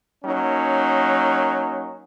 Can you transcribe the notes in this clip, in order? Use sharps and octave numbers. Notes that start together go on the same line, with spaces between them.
F#3 A#3 C#4 D#4